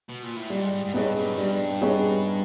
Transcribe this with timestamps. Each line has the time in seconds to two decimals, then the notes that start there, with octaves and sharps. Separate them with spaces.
0.09 B2
0.23 A#2
0.36 A2
0.50 G#2 G3
0.72 G#2
0.85 G#2
0.94 G2 B3 D#4 G#4 C#5
1.16 G2
1.32 F#2
1.38 G2 G3
1.81 B3 D#4 G#4 C#5